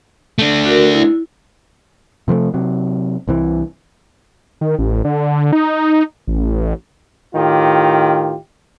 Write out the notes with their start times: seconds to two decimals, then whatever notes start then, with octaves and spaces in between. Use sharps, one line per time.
0.39 A3 D4
0.66 F#4 A#4
0.94 E4
2.28 C3 F3 G#3 A3
2.54 C3 F#3
3.28 C2 C3 E3
4.61 D#3
4.79 A1
5.05 D3
5.52 D#4
6.27 A1
7.35 A2 D#3 F4 G4